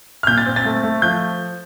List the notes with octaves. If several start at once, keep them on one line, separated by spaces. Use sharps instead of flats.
F6
A#2 G6
A6
C4
A6
A3
A3
F3 G6